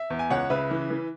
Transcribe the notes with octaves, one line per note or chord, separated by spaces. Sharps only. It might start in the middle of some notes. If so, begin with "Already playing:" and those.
Already playing: E5
E2
G#5
C#2 C#5 F#5
C#3 B4 E5
E3
E3